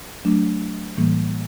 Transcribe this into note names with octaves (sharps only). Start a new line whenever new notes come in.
F#3 A3 D4
A2 E3 G3 A#3